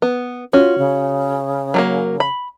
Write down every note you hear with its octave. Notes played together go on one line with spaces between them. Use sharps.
B3
C#4 F4 F#4
C#3
F#3 A3 A#3
B5